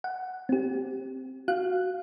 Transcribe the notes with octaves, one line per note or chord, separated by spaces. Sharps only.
F#5
C4 G4
F#4 F5 F#6